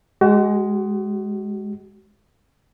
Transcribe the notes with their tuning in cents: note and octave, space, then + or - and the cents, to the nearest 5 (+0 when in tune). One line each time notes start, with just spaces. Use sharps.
G#3 +0 F#4 +35